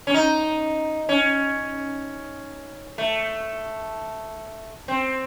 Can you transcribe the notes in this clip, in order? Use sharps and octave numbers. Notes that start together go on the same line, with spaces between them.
C#4
D#4
C#4
A3
C4